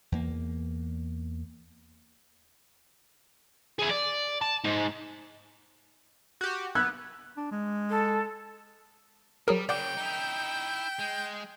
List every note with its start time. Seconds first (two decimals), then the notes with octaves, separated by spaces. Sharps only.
0.12 E2 A#3
3.79 E4 G#4
3.91 D5
4.42 A5
4.64 G#2
6.41 F#4 G4
6.75 B3 E6 F#6 G#6
7.37 D4
7.52 G#3
7.90 A4
9.48 F#3 G3 G#4 A#4
9.69 C#3 F#3 D5 F#5 G5 D6 G6
9.97 D#4 E4
10.99 G#3